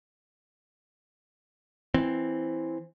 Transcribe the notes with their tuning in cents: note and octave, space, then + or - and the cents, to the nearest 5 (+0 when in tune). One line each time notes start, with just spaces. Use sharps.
E3 +0 C4 +0